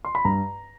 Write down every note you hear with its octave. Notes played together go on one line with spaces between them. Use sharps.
C6
B5
G2 A#5